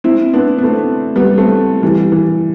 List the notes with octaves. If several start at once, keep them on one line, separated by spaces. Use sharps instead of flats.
C4 E4
B3 D4
B3
A3 C4
G3 B3
A3 C4
E3 G3
E3